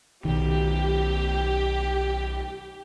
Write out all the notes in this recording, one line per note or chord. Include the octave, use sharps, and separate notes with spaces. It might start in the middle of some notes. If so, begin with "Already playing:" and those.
B1 D#3 G4